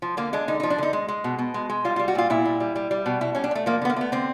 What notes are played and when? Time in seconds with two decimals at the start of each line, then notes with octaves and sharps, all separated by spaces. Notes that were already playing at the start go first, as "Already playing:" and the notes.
0.02 F3
0.17 D3 A#3
0.33 G#3 D4
0.48 D3 D#4
0.60 D#4
0.63 F3
0.70 D4
0.78 D3 D#4
0.93 G#3
1.08 G#3
1.24 B2
1.39 B2
1.54 G#3
1.70 G#3
1.85 G3 F4
1.96 F4
1.99 G3
2.08 F#4
2.15 A#2 F4
2.30 A#2 E4
2.45 G3
2.60 G3
2.76 G3
2.91 G3
3.06 B2
3.21 B2 E4
3.35 G3 C#4
3.44 D4
3.51 G3
3.55 A3
3.66 F3 A#3
3.82 D3 B3
3.89 A#3
3.96 A3 B3
4.12 D3 C4